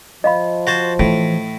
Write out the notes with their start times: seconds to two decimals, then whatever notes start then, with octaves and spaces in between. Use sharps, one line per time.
0.24 F3 D#5 F5 B5
0.67 F#4 C5 A5
0.99 A2 E3